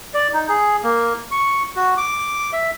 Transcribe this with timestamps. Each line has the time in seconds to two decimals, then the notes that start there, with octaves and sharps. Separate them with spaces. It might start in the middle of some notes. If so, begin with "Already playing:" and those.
0.14 D5
0.33 D#4
0.49 G#4
0.83 A#3
1.31 C#6
1.76 F#4
1.97 D6
2.53 E5